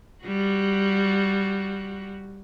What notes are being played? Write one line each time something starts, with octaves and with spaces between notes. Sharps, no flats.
G3 F#4